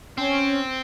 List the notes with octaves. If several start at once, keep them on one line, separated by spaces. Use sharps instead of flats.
C4 C#4